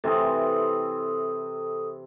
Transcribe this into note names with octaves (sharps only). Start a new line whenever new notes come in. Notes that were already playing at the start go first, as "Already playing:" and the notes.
C3 E3 C4 A4 D#6